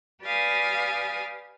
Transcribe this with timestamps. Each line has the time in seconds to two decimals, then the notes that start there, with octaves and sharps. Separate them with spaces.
0.22 G4 B4 D5 F5 G#5 D#6